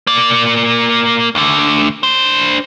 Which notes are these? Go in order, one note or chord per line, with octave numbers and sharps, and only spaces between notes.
A#3 D5
D2 D3
D4 C5